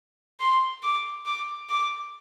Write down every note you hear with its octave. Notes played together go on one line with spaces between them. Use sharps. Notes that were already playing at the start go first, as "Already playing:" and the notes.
C6
D6
D6
D6